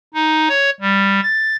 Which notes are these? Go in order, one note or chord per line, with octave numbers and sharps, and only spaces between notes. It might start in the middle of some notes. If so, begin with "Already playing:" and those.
D#4
C#5
G3
A6